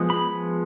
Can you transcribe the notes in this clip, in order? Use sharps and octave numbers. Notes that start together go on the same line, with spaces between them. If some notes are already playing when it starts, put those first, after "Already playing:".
Already playing: F3 G#3 B3
B5